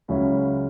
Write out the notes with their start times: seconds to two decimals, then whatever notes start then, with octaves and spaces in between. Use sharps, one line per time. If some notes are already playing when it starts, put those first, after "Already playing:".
0.08 C#2 C#3 F#3 C#4 E4